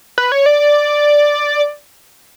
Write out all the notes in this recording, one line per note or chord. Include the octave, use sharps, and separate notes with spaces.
B4
C#5
D5